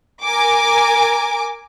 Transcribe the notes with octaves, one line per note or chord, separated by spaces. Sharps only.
A#4 G#5 D6